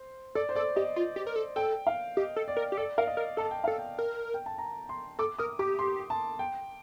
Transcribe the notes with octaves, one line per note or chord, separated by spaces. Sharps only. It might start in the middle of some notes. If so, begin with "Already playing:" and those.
Already playing: C5
A4 D5
C5
A4 D5
G4 D#5
F4
G4
A#4
A4
A4 G5
F5
G4 D#5
A4
D5
A#4
G4
A4 D5
A#4 F5
D#5
A#4
A4 A5
G5
A4 F5
G5
A#4
G5
A5
A#5
C6
A4 D6
A#4 D#6
G4 D6
C6
A5
G5